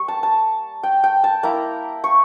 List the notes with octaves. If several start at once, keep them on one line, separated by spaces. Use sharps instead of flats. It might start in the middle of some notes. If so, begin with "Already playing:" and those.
Already playing: G3 A#3 C#6
A5
A5
G5
G5
A5
A#3 E4 A#5
C#6